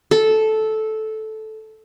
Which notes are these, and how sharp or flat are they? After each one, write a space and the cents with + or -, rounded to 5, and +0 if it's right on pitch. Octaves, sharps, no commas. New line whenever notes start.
A4 -10